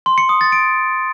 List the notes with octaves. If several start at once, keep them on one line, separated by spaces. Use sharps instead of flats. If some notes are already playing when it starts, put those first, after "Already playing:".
C6
C#7
D#6
A6
D7